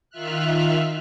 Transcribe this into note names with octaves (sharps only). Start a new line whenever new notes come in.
D#3 F4 E5 F6 F#6